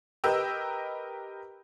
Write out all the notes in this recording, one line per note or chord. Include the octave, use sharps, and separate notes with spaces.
G4 A#4 B4 D#5 G5 E6